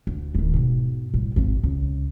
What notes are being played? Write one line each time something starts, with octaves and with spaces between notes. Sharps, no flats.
D2
D1 D#3
G#2 B2
A2 G3
G#1 F2
C#2